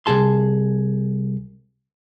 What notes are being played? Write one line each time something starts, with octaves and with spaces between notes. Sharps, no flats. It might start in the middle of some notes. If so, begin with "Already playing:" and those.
C2 G2 G#4 A5 C6